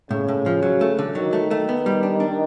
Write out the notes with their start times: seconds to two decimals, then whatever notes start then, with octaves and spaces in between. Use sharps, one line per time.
0.11 A2 C#3
0.28 A2
0.46 F3
0.63 F#3
0.81 A3
0.99 D3
1.15 D#3 F#3
1.33 A3
1.51 A3
1.69 B3
1.86 G3
2.03 D4
2.20 D4